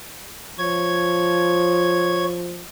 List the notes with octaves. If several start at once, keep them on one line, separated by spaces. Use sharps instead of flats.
F3 C#5 G#6